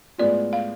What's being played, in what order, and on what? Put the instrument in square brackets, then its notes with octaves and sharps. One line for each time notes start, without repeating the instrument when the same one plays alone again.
[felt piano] A2 G#3 B3 F4 [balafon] D5
[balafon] F5